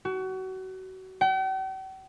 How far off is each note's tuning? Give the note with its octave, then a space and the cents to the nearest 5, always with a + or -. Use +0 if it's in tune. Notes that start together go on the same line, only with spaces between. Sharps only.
F#4 +30
G5 -45